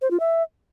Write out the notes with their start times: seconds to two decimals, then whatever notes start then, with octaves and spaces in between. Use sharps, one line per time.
0.02 C5
0.11 F4
0.20 E5